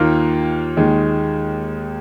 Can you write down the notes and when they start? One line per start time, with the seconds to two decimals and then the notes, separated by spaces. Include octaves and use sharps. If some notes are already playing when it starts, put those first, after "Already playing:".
Already playing: D#2 D#3 A#3 F4
0.77 D#2 D#3 G#3